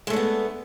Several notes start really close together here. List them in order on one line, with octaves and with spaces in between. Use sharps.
G#3 A3 D4 B3